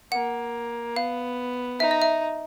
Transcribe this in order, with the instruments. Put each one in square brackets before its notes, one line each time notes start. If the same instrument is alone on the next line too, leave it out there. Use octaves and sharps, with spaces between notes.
[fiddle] A#3 [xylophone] F#5
[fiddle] B3 [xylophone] F5
[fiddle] D#4 [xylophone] E5
[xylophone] D#5
E5